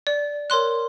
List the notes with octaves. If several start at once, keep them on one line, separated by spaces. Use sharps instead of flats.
D5
A#4 C#5 C6 F#6